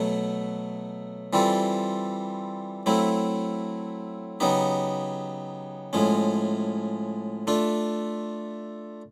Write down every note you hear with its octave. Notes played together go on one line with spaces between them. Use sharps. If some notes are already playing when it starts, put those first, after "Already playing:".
Already playing: B2 F#3 A3
E3 G3 C4 F4 A4
F#3 A3 C4 E4
C#3 F#3 B3 D#4 G4
A2 F3 G#3 C#4
A3 D4 F4